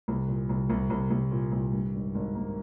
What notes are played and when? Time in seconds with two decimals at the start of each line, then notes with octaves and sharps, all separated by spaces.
0.08 C2
0.28 A#2
0.49 C2
0.70 C2
0.90 C2
1.11 C2
1.31 A#2
1.52 C2
1.73 G2
1.94 G#1
2.14 G#1
2.35 A#3